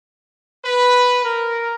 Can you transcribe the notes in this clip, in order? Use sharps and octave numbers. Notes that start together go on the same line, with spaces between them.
B4
A#4